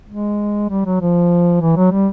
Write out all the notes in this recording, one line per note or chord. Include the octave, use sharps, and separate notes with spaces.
G#3
G3
F#3
F3
E3
F#3
G3